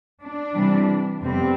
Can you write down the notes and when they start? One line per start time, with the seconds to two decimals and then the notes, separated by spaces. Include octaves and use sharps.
0.22 D4
0.55 C3 E3 G3
1.21 F2 C3 G3 B3 C4